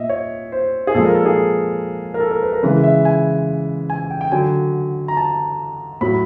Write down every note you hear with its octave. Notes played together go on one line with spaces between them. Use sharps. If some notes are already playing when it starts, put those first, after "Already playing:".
Already playing: A#2 D#5 E5
C#5
C5
G#4
A#2 F3 G#3 A4
A#4
A4
G#4
A#4
A4
A#4
B4
A#4
C#3 E3 G#3 B4
E5
G#5
G#5
G5
G5
D3 F#3 G#5
A#5
A5
A2 F#3 B5